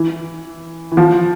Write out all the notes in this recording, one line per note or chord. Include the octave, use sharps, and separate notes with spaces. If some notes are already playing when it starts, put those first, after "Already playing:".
Already playing: E3
E3
F3